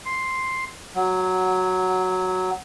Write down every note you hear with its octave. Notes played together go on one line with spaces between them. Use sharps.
C6
F#3